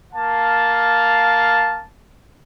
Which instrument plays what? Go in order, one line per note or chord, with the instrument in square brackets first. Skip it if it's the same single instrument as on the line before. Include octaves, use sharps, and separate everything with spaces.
[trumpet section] A#3 F5 A5